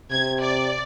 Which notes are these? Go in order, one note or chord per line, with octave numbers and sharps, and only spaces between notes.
C3 G#6
D5